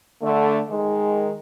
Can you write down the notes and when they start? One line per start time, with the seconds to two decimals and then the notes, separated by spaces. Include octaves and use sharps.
0.22 D3 A3
0.69 D#3 G#3